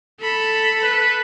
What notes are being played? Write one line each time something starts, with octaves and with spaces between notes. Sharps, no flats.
A4 B5
B4